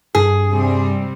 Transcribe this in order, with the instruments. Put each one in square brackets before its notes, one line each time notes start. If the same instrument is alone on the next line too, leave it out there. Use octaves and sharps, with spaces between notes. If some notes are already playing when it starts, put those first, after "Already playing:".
[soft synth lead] G2 [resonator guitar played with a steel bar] G#4
[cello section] C3 G3 C4